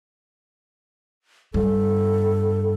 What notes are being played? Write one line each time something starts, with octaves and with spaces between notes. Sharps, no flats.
G2 A4